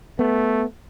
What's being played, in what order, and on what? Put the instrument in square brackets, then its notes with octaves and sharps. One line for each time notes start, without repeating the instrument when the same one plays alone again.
[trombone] A3 [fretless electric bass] B3